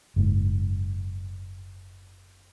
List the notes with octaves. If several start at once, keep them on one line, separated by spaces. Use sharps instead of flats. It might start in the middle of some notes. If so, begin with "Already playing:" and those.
F#1 G#2